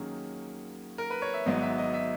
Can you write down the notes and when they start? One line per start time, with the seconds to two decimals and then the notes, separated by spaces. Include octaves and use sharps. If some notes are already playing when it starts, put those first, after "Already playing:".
Already playing: D#2 D#3 F#3 A#3 C#4 G#4
0.98 A#4
1.10 B4
1.22 C#5
1.34 E5
1.46 G#1 G#2 F#3 B3 D#5
1.62 E5
1.78 D#5
1.94 E5